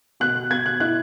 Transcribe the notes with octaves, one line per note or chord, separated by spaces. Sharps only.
B2 F#6
B2 G#6
F#6
E4 F#6